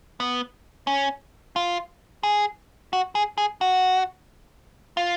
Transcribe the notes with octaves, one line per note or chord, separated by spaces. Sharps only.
B3
C#4
F4
G#4
F#4
G#4
G#4
F#4
F4